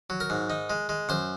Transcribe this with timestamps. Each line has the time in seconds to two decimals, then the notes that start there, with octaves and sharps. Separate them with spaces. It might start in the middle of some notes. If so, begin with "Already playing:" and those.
0.10 F#3
0.20 A#4
0.30 G#2
0.50 D#4
0.70 G#3
0.89 G#3
1.09 F#2 C5